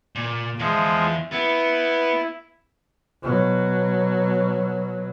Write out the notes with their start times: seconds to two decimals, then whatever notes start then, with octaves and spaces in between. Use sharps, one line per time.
0.15 A#2
0.59 E2 F3 G#3 E5
1.32 B3 E4
3.22 B2 F#3